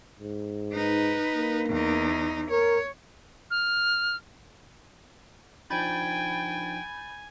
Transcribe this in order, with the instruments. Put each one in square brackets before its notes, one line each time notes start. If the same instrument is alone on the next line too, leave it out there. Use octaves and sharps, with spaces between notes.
[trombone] G#2
[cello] D#4 B4
[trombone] A#3
[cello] E2 D#4
[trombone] A#4 [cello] C#5
[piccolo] F6
[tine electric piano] F3 D4 D#4 [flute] G5 [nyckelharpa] G#5 [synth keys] B5 G6 A6